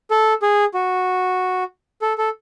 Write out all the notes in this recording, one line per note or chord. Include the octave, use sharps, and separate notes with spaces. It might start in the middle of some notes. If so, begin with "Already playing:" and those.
A4
G#4
F#4
A4
A4